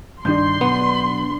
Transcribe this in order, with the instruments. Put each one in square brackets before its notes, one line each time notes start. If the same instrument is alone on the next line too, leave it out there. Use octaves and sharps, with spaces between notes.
[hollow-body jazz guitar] G2 D#3 [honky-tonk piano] D4 G6 [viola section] C6
[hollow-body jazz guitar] B1 [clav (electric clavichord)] B3